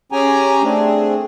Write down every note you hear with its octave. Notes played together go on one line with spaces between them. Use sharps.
C#4 G4 G#4 G5 G#5 A#5
A3 C4 D4 G#4